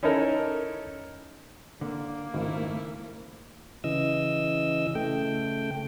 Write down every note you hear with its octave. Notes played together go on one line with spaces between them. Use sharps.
C#4 D#4 E4 A4 A#4
D3 A#3
G#1 C#2 A3 E4
C#3 E3 D#5 E6
C#3 A3 G5